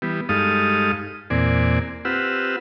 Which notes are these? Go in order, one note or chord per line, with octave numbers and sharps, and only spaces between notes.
E3 G3 B3
G2 G#3 D#4 A4 F5 D#6
E2 A#2 C4 D5 G#5
C4 F4 G4 B4 F#5 E6